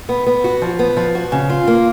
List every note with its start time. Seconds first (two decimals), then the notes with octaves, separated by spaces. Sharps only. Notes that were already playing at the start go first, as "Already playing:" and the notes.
0.09 B3
0.26 B3
0.44 F#4
0.62 F3
0.79 B3
0.97 F3
1.15 F#4
1.32 C#3
1.50 F4
1.68 A#3